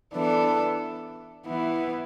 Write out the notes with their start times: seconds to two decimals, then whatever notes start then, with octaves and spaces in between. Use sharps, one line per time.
0.14 E3 B3 D4 A4
1.45 E3 B3 E4